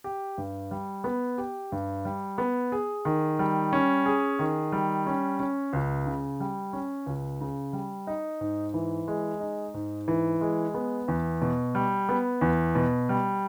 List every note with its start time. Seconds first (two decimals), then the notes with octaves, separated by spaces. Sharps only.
0.04 G4
0.38 G2
0.71 G3
1.04 B3
1.38 G4
1.72 G2
2.05 G3
2.38 B3
2.72 G#4
3.05 D#3
3.39 G3
3.73 C#4
4.06 G#4
4.39 D#3
4.72 G3
5.06 C#4
5.40 C#4
5.73 C#2
6.06 C#3
6.40 G3
6.73 C#4
7.06 C#2
7.40 C#3
7.73 G3
8.07 D#4
8.41 G#2
8.74 E3
9.08 G#3
9.40 D#4
9.74 G#2
10.08 E3
10.41 G#3
10.74 B3
11.08 E2
11.42 B2
11.75 G3
12.09 B3
12.41 E2
12.75 B2
13.09 G3